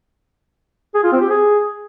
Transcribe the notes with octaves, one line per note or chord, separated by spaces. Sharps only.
G#4
F4
C4
G4
G#4